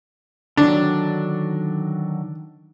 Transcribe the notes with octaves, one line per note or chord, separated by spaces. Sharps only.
D3 D#3 F#3 D4